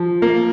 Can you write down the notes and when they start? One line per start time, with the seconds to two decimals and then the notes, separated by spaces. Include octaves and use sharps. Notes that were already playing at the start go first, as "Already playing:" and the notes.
Already playing: F3
0.22 A#3